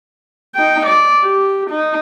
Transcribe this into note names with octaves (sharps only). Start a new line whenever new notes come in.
D#4 G5
D5
G4
D#4